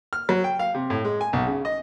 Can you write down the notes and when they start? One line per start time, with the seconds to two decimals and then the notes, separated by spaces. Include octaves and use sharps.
0.13 F6
0.29 F#3
0.44 G5
0.59 F5
0.74 C3
0.90 A2
1.04 G#3
1.21 G#5
1.33 B1
1.46 C#3
1.65 D#5